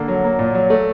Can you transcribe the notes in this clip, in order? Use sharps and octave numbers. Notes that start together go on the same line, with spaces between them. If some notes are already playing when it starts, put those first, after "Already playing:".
Already playing: D3 A#3
F#3
A#3
A#2
F#3
A3